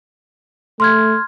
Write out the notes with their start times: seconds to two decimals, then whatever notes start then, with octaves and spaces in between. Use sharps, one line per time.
0.80 A3 C6 F6 G#6